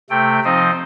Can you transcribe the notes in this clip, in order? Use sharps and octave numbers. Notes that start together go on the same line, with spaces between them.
C3 A3 G5
F3 C4 D#4 C5 D#5